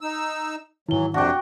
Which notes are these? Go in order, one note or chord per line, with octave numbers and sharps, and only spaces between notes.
D#4 E6
G#2 D#3 E3 F#3 E4 G7
F2 C3 D4 F#4 G5 C#6 D6